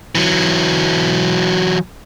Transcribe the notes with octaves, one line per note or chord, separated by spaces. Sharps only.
E3 F#3